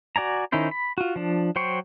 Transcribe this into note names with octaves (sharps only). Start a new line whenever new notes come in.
F#4 D5 G#5 A#5
D#3 C#4 D#4 E4 C5
B5
F4 F#4
F3 D4
F#3 C5 G5 C6 C#6